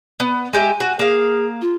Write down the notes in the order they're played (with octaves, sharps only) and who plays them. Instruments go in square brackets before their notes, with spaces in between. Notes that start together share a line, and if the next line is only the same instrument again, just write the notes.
[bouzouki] B3
[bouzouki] G#3 G4 E5 [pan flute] G#5
[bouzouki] F#4
[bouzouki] A#3 F5 [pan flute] G#4
[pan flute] F4